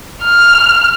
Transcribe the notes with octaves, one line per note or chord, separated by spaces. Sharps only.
F6